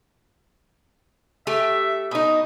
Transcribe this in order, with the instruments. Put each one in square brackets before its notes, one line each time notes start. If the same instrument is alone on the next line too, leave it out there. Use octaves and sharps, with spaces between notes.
[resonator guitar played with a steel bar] A3 G4 [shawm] E5
[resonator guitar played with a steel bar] B2 D#4 [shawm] D#6